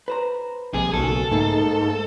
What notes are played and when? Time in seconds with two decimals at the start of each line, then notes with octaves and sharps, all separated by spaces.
0.08 B4 C5 A#5
0.74 A#1 C3 G#3 G#4
0.94 B1 C#3 A#3 F#4 A4
1.31 G#2 A3 A#3 D#4